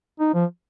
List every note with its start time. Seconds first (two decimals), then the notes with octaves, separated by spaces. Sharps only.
0.20 D#4
0.34 F3